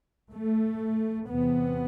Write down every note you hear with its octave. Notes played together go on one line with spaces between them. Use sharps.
A3
E2 C3 B3